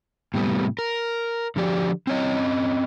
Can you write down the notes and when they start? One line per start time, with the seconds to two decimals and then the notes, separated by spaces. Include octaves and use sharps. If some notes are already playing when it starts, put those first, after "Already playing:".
0.34 A2 C3 G3 B3
0.79 A#4
1.56 D3 F3 G4 D5
2.07 C4 C#4 C#5 D#5